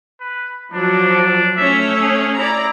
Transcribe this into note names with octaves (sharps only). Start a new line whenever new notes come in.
B4
F3 F#3 D4
A3 C#4 C#5 E5
G#4
E4 D5 A#5